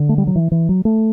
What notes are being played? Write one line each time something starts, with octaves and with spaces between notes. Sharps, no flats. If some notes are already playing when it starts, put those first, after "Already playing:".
Already playing: D3
A3
G3
F#3
E3
E3
F#3
A3